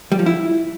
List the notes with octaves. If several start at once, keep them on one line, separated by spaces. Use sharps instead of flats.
G3
F3
E4